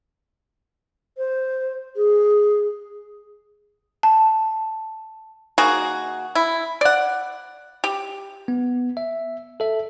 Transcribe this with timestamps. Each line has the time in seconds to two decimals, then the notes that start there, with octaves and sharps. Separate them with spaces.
1.17 C5
1.96 G#4
4.03 A5
5.58 D#3 A#3 F#4 G#4
6.35 E4
6.81 D5 F#5
7.84 G4
8.48 B3
8.97 E5
9.60 A4 E5